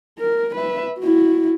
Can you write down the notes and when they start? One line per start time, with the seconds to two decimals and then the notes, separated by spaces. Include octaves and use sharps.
0.19 A#4
0.55 B4 E5
0.99 E4 F#4